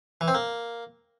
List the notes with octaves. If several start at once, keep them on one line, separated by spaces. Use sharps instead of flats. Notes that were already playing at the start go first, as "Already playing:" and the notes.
E3
C4
A#3